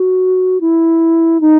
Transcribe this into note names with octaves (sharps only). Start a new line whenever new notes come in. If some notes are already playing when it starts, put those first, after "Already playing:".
Already playing: F#4
E4
D#4